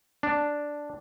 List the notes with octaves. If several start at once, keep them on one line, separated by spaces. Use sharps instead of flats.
D4